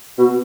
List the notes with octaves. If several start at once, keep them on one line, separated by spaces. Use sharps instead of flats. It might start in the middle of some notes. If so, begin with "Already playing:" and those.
B2